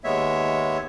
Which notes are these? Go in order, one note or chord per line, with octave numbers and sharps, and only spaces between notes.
D#2 G#3 B3 C#5 E5